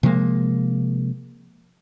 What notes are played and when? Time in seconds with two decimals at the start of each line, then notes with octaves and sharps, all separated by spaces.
0.03 C3 F3 G#3 A#3